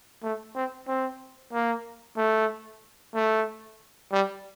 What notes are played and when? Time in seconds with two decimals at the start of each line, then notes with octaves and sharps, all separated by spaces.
0.23 A3
0.55 C4
0.88 C4
1.53 A#3
2.17 A3
3.14 A3
4.12 G3